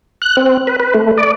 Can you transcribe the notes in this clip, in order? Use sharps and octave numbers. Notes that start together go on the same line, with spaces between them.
F#6
C4
B4
B4
A3
D5